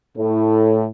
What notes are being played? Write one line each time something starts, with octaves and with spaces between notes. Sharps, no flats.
A2